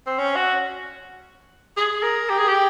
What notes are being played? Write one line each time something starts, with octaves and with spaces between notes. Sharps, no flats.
C4
C#4
F#4
G#4
A#4
G4
G#4
G4